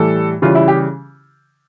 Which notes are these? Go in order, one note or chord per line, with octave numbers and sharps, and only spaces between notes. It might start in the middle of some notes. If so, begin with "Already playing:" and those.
Already playing: A2 E3 G3 A4
C#3 E3 G3 F4
E4
G4